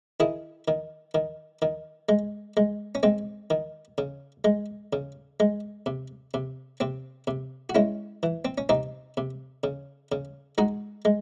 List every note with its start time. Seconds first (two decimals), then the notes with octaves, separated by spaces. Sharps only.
0.20 D#3 E4 G#4
0.68 D#3
1.15 D#3
1.62 D#3
2.09 G#3
2.57 G#3
2.95 C#4
3.03 G#3 C4
3.50 D#3
3.98 C#3
4.44 G#3
4.93 C#3
5.40 G#3
5.86 C3
6.34 C3
6.80 C3 C4
7.27 C3
7.70 F#4
7.75 G#3 C#4 E4
8.23 E3
8.45 C4
8.58 C#4
8.69 C3 C4 D#4
9.17 C3
9.64 C#3
10.12 C#3
10.58 G#3 D#4 F#4
11.05 G#3